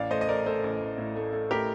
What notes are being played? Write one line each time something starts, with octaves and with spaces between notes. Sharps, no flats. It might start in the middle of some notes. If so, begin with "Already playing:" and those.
Already playing: A1 D5 F5
A3 C5 D#5
D#5
A3 A#4 D5
A3 A4 C5
A1
A1
A2
A3
A3
A2 G4 A#4